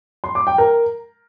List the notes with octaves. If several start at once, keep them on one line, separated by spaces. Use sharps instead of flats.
C6
D6
G5
A#4